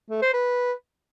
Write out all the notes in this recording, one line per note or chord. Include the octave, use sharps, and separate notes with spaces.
A3
C5
B4